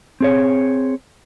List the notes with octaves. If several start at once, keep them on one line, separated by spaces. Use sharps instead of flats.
C4 G#4 C#5